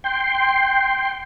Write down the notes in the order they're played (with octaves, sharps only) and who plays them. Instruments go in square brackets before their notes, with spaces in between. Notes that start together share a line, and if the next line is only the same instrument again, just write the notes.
[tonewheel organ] G5 C6